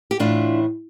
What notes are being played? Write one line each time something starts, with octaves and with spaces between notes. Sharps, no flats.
G4
A2 E3 D4 F4